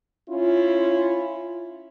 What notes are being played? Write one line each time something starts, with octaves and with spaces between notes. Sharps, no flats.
C#4 E4 F4